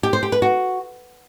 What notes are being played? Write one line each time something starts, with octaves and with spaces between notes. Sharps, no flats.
G4
C5
G4
B4
F#4